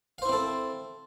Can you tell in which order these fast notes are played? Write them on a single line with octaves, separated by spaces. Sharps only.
F5 C5 E4 C4 A4